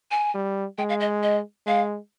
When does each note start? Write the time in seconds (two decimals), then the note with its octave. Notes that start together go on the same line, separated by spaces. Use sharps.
0.11 G#5
0.34 G3
0.78 G#3 G5
0.89 F5
1.00 D#5
1.23 D#5
1.66 G#3 F5